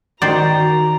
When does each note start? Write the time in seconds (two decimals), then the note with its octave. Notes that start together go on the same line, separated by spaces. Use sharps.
0.22 D#3 F#4 C5 D5 A#5